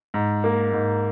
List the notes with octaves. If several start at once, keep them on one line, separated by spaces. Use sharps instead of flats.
G#2
A#3
G#2